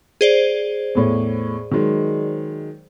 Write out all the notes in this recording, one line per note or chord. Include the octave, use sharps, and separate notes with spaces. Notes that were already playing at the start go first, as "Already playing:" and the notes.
G#4 C5 D5
E2 A2 C#5
D#3 F#3 G#3